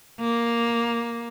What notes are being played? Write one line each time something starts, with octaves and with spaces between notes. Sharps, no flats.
A#3